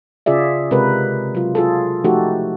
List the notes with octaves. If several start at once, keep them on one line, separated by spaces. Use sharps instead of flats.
C#3 F4 G#4 D5 E5
C3 G#3 A#4 B4
F#3 F4
F4 G#4 A4
F3 A3 D#4 F#4 G4 A4